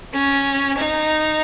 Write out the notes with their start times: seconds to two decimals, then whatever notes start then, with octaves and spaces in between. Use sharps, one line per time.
0.13 C#4
0.78 D#4